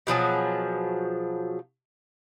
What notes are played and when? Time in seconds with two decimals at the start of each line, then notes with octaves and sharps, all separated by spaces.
0.07 B2 F3 F#3 G#4